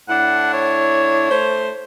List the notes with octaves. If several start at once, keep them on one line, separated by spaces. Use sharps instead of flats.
A2 D4 E4 F#5
C#5
A3 C5